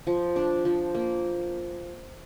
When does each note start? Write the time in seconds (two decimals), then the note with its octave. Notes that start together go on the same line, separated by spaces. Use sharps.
0.07 F3
0.36 D4
0.65 F3
0.95 A#3